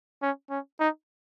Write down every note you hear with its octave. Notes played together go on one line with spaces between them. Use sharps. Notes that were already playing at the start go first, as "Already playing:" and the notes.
C#4
C#4
D#4